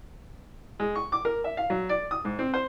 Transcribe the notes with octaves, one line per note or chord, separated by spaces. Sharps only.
G#3
C#6
D6
A#4
E5
F5
F#3
D5
D#6
G#2
C4
C5